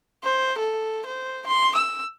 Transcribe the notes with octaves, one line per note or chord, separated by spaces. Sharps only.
C5
A4
C5
C6
E6